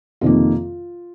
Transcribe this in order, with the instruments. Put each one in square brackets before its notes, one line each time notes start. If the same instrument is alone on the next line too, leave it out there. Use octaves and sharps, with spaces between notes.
[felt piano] F2 C3 D#3 A#3 F4